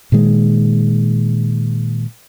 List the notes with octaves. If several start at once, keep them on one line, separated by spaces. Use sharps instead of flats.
A#2 D#3 G#3